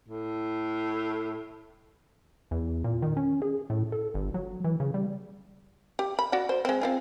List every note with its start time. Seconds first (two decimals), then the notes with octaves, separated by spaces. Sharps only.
0.08 A2
2.51 E2
2.84 A#2
3.02 D#3
3.17 C#4
3.42 G#4
3.70 A2
3.92 A4
4.14 G1
4.34 F#3
4.64 E3
4.80 C#3
4.94 G3
5.99 G4
6.19 B5
6.32 F#4 D5 F#5
6.49 C5
6.65 G#3 C4
6.81 C4 F4 G#4